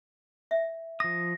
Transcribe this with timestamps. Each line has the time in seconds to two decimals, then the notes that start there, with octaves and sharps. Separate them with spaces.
0.51 E5
1.00 F3 D#6 A#6